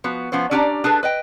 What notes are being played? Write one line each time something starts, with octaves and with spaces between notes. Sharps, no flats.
F3 B3 F#4
F3 B3 C#4 C5
C#4 D4 G4 D5 G#5 A#5
D4 G#4 A4 B4
B4 D#5 G5